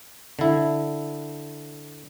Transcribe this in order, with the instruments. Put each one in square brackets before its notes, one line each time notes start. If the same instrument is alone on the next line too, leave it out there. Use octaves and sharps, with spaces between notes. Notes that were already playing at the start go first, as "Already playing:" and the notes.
[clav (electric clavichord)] D3 E4